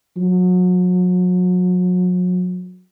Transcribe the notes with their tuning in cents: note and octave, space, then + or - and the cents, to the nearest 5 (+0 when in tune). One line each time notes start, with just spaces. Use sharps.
F#3 -35